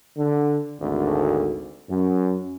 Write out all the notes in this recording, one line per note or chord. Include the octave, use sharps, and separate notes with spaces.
D3
G#1 D2
F#2